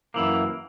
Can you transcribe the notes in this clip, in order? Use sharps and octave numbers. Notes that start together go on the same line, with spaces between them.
F#2 E3 A#3